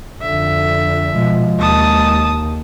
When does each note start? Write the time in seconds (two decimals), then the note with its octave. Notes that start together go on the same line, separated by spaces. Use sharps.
0.21 F2 D3 E5
1.14 B2 F3 G#3
1.59 D#2 A5 D#6